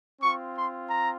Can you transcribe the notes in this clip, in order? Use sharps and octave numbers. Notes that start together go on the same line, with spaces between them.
C4 F4 C#6
C6
A#5